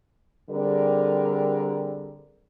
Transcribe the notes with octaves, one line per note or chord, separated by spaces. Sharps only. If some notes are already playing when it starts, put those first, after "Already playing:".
D3 G3 C4 G#4 A#4 D5